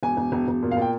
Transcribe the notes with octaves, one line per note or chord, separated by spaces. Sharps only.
E1 G#5
E1
E1
E1
A#2
F5
A#2
G5